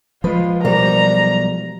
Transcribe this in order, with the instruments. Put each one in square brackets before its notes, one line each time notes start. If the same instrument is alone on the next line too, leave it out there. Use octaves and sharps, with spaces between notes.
[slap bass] F3 G#3 [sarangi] F4 [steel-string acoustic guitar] B4
[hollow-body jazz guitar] B1 G3 [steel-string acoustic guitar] A#4 C5 D5 [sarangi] A#5